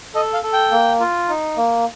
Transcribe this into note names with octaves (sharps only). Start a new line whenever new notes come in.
A4 D#5
F5
A4
G5
A#3
F4
D#4
A#3